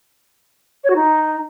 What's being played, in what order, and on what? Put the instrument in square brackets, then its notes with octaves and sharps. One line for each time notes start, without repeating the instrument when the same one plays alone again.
[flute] C#5
F#4
D#4